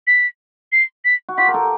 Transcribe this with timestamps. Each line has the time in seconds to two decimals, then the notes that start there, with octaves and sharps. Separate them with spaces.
0.07 B6
0.72 C7
1.05 B6
1.29 F#4
1.38 F4 G4 B6
1.48 A#4
1.54 G4 A4